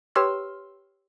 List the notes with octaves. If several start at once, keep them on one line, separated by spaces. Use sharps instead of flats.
G4 B4 C#5 C6 E6 F6